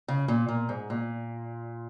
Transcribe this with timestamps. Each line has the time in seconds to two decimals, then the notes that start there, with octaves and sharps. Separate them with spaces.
0.08 C#3
0.28 A#2
0.49 A#2
0.69 G#2
0.90 A#2